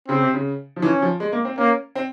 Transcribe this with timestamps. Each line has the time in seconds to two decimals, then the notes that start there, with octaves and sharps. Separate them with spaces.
0.08 C#3 C4
0.21 C3
0.34 C#3
0.76 F3
0.82 E3 C#4
1.02 F3
1.20 G#3
1.32 A#3
1.45 C4
1.58 A#3 C#4
1.95 C4